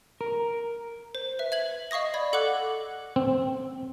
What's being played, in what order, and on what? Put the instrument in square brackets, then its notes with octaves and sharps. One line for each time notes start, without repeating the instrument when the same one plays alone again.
[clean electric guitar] A#4
[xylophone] C5
B4 E5
E5 G#6 F#7
D#5 F5 C#6 D#6 A#6
D5 B5 G#6
A4 F#5 C#6 D6 F#6 F#7
[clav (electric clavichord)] C4